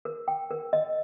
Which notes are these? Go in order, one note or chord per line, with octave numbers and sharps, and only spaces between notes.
A#4
G5
A#4
D#5